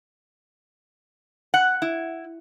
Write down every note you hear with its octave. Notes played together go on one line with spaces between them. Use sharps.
F#5
E4